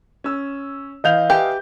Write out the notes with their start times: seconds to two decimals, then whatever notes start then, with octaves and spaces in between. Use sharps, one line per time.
0.24 C#4 E6
1.04 E3 D#5 F5 G6 F7
1.30 G4 B4 E5 G#5